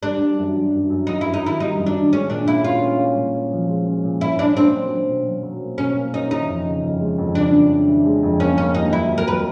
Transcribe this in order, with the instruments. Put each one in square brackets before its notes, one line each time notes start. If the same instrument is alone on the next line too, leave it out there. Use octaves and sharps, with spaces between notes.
[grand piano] G3 [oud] D4
[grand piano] G3
F#2
F#2
F#2
F#2
[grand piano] F#2 [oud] D#4
[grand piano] F#2 [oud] E4
[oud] D#4
[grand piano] D#3 [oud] E4
[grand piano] G3 [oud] D#4
[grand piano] F#2
[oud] D4
[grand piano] D#3
[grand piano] G#3 [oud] C#4
[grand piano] A#2 [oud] D4
[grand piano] C#4 [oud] E4
[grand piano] C#4 [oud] F4
[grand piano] C#4
C#4
A#2
C#4
F3
G#3
C#4
A#2
[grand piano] C#4 [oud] E4
[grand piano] C#4 [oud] D4
[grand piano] A#3 [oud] C4
[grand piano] F#3
F#3
B2
F#3
F#3
A#3
[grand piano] B2 [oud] C#4
[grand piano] A#3
[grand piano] C#4 [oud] D#4
[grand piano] E3 [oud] D#4
[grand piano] F2
C#3
F2
G#3
F2
[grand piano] C#3 [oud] D4
[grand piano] F2
E3
E3
G#3
F2
[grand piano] A#3 [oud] C#4
[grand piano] A#3 [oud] C#4
[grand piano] D#2 [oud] D#4
[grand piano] F#3 [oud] E4
[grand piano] F#3
[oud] A#4
[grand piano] F#3 [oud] B4